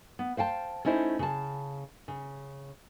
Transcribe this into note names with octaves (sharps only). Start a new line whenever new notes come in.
B3
C5 F5 G5 A5
A3 C#4 D#4 E4 C5
C#3 A5
C#3